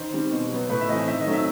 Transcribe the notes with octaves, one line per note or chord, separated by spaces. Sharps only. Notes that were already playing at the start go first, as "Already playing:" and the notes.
Already playing: D#3 C5
G3 C4
B2
F#3 B3
A2 B4
E5
E3 A3 C4 D#5
D#3 E5
D#5
F#3 A3 C4
E5